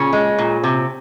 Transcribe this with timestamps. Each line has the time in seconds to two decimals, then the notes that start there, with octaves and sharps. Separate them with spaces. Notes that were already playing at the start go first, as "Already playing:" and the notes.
Already playing: A#2 C#3 C#4
0.13 G#3
0.38 A#2
0.64 C3